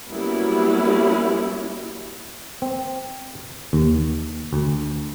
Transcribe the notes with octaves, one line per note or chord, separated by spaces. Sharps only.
F#3 G3 A#3 B3 C#4 E4
C4
D#2
D2